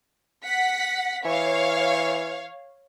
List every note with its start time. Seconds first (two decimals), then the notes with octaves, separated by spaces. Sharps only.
0.44 F#5 B6
1.25 E3 C#5 F5